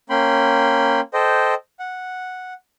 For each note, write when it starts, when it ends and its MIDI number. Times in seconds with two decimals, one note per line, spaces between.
0.10 1.01 58
0.10 1.01 61
0.10 1.01 79
0.10 1.01 83
0.10 1.01 84
1.14 1.54 69
1.14 1.54 72
1.14 1.54 75
1.14 1.54 79
1.80 2.53 78